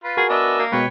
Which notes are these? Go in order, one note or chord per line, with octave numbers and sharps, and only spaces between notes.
F4 B4
F#4 G#4 A#4 G#5
B3 D4 D#5 E5
A#3
B2 G#3 B4 C#5 G5